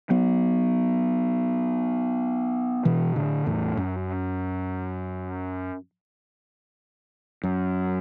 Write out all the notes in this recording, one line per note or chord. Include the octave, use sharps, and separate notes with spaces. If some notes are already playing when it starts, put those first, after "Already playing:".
F#3 B3
B2 E3
A2 D3
E2 A2
F#2
F#2